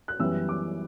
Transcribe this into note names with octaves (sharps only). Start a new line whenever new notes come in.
F#6
F#2 E3 G3 B3 E6
D6